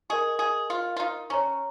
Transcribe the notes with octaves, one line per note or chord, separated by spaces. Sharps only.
G#4 A#4 D#5 C#6
G#4
F4
F4
D#4
C#4 C#5 A#5 C#6